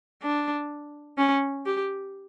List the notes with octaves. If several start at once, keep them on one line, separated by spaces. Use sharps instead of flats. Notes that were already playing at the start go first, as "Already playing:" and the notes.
D4
C#4
G4